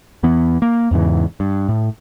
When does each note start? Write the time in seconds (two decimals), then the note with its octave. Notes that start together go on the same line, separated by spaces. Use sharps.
0.23 E2 E3 B3
0.62 A#3
0.91 E2 G#2 C#3 E3
1.40 G2
1.69 A2